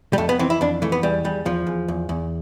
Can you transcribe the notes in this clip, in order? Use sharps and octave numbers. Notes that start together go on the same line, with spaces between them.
G3
F2 A3
B3
E3 C4
E4
F2 D4
E3 A3
B3
E2 G3
E2 G3
E2 F3
E2
E2
E2